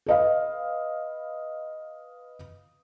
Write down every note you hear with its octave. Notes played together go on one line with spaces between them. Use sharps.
B4 D#5 F5